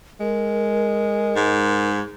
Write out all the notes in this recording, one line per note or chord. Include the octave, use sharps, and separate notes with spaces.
G#3 A#4
G#2